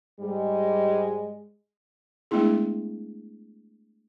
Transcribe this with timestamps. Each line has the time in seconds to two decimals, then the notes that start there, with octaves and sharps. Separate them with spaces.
0.19 G#2 G3 G#3
2.31 G#3 A3 B3 D4 E4 G#4